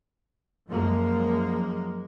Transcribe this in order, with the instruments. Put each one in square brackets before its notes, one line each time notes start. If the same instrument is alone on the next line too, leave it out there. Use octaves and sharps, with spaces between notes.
[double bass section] F#2 F3 G#3 A#3